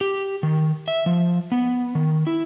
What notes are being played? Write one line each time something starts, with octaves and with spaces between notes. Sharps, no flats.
G4
D#3
E5
F3
B3
D#3
E4